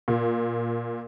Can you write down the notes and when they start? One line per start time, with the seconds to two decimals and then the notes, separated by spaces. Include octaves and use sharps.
0.08 A#2